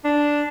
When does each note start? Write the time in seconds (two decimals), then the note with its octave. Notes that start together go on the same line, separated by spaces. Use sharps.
0.05 D4